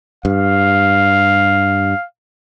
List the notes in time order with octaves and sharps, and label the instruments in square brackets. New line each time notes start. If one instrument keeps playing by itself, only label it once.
[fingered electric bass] G2 [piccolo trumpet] F5